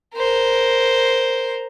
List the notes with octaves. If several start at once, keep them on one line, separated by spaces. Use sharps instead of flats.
A#4 C5